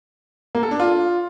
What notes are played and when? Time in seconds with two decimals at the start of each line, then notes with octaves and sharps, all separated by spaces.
0.55 A#3
0.63 A4
0.71 D4
0.80 F4